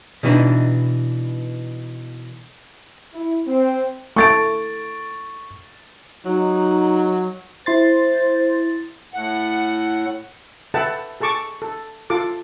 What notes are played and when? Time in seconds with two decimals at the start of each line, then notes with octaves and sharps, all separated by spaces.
0.23 B2 E3 D4 D#4
3.13 E4
3.47 C4
4.16 A3 C#6 A6 D7
6.26 F#3 D#4
7.66 E4 C5 C6 A6
9.14 A2 F#5
10.74 A4 B4 E5 F#5 G5 A5
11.21 G#4 A4 A5 C#6 D6
11.62 A4
12.10 F4 A4 D6